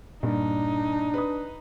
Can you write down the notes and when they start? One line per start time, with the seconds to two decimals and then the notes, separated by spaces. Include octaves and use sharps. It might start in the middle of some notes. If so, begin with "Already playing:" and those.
0.23 G2 A#2 D4 D#4
1.14 B4 D#6